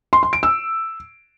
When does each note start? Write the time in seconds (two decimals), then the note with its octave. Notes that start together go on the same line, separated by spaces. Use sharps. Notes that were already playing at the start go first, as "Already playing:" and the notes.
0.13 C6
0.23 C6
0.33 D7
0.43 E6